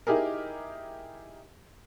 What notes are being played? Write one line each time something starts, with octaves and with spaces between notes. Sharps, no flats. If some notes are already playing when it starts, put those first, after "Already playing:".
D#4 E4 G4 G#4 A#4